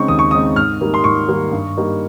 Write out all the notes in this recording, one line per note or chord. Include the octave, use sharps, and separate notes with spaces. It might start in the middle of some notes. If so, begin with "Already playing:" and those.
Already playing: C#3 G#3 C4 D#4 C#6
D#2 D#6
C#6
C#3 G#3 C4 D#4 D#6
G#2 F6
D#3 G3 A#3
C6
G#2 C#6
D#3 G3 A#3
G2
G3 A#3 D#4